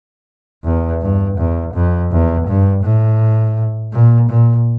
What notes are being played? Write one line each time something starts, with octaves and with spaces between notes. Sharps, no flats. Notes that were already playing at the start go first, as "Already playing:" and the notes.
E2
G2
E2
F2
E2
G2
A2
A#2
A#2